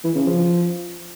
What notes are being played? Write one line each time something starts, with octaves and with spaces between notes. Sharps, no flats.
E3
C#3
F3